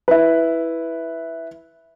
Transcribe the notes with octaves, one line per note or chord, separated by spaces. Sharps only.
E4 B4